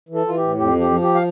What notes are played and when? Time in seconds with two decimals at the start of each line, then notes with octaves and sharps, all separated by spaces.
0.09 E3
0.15 A4
0.26 E3 F4
0.37 G4
0.42 A2
0.58 F2 G4
0.75 F3
0.81 G4
0.90 F3
1.02 G4
1.15 F5